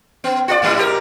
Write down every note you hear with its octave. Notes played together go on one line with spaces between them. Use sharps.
B3
F4 G#4 D5
G#2 G3 E4
G4 A#4